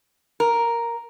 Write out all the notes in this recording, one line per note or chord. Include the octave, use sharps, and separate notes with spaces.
A#4